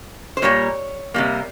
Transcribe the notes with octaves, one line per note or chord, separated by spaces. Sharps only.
C5
A#2 G3 A#3 C#5
C3 G3 A#3